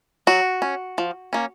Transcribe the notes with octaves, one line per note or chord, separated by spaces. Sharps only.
F#3 F#4
C#4
F3
A#3 C#4